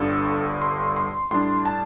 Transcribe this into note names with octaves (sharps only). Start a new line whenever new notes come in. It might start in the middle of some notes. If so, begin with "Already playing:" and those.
Already playing: G1 G2 D3 G3 A4
C6
C6
A2 G3 D4 C6
A5